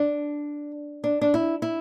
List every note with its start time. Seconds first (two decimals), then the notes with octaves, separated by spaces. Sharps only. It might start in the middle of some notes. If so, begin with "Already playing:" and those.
Already playing: D4
1.04 D4
1.21 D4
1.34 E4
1.62 E4